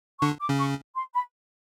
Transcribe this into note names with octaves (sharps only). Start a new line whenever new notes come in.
D3 D4 C#6
D6
C#3 C#4
C#6
C6
B5